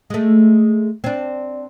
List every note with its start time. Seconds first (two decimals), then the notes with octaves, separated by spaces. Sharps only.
0.10 G#3 A3
1.04 C4 D4